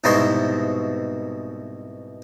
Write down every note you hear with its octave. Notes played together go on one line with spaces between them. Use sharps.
C2 G#2 B2 E4 C6